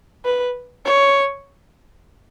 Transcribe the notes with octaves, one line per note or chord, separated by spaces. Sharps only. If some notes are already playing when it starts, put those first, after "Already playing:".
B4
C#5